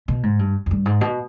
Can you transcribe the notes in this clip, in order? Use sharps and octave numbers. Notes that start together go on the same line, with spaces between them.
B2
G#2
G2
F2
G2
G#2
B2